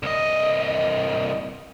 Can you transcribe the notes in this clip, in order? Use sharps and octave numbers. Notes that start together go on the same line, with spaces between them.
C2 D#5